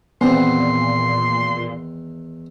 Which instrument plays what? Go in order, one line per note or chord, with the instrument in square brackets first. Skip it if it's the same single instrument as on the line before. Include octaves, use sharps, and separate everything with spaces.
[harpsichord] E2 D#3 [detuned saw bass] A#2 [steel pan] B3 C4 [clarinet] C6